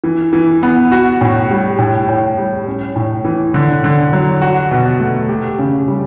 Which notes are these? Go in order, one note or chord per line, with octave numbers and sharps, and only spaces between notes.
E3
E3
B3
F#4
A2
G3
A2
A2
G3
C#4
A2
E3
D3
D3
F#3
F#4
B2
A3
G4
C#3
G3